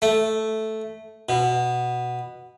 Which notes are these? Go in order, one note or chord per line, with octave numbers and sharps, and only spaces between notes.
A3
B2